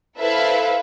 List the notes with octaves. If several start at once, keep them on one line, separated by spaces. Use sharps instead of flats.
E4 A4 B4 C5 E5 F5